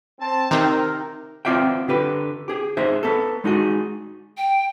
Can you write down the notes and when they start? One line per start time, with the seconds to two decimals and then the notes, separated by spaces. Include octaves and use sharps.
0.20 C4 A5
0.51 C3 D#3 C4 D#4 A#4
1.45 B3 C4 F4 D5 E5 G5
1.88 D3 G4 B4
2.48 G4 G#4
2.77 D#4 G#4 C5 E5
3.03 B3 A4
3.44 G#3 D#4 F#4 G#4
4.37 G5